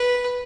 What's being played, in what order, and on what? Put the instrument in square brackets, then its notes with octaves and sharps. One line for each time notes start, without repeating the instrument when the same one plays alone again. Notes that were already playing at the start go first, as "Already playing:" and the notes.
Already playing: [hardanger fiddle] B4